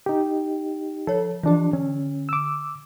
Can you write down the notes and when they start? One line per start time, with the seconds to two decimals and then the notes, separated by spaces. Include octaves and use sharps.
0.06 D#4 G4
1.07 F3 A4 C#5
1.43 E3 F3 D4 G4
1.73 D3 C#4
2.29 D6 E6